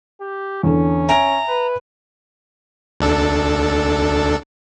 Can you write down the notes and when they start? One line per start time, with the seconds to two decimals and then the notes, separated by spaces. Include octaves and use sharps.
0.21 G4
0.63 E2 D3 C#4 A4
1.09 E5 G#5 A#5 D7
1.48 B4
3.00 D2 D4 A4